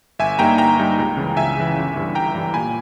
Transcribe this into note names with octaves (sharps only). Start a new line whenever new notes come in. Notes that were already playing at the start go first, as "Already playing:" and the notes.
G1 E5 G#5
G2 G3 A#3 D#4 G5 A#5
G1 G5 A#5
G2 G3 A#3 D#4
C#2
C#3 E3
C#2 E5 G#5
C#3 E3
G1
G2 E3 G3
G1 G5 A#5
G2 E3 G3
A#2 G#5 B5